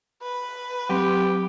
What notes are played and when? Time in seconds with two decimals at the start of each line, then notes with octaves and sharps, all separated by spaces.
0.23 B4
0.89 F#3 C4 G4